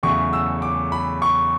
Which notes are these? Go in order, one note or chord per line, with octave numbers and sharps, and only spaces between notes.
E2 C#3 F#3 A3 C#6
E6
D6
B5
C#6